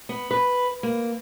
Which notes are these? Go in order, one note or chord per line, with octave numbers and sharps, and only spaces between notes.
B3
B4
A#3